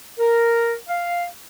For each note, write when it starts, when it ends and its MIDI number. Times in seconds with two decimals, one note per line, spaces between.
0.19 0.74 70
0.88 1.25 77